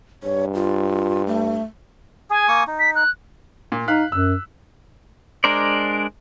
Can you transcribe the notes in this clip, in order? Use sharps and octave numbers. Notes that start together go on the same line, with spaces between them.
G2 C#5
F4
A3
G#4 G#5
A#3 C#6 D#6
D#4
B6
F#6
A#2
D#4 F5 F#6 B6
F#2 E6
G#3 D4 A#4 C5 D5